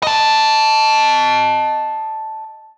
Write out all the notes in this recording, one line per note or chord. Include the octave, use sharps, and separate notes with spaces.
D#5 A5